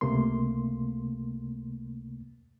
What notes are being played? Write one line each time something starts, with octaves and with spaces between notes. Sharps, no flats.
C#2 C3 A3 A#3 C6